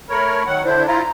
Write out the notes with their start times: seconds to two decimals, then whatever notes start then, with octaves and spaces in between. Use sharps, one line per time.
0.10 A3 A#4 C#5 B5
0.46 D#3 F#3 F#5
0.65 D3 D4 E4 C5
0.87 E4 F4 A#5